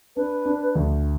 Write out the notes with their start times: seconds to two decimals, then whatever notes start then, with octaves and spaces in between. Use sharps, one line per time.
0.16 D4 B4
0.45 D4
0.75 D2